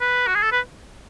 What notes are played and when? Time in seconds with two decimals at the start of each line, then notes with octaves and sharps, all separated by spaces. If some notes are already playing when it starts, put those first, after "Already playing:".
0.01 B4
0.27 F#4
0.35 G#4
0.43 A4
0.52 B4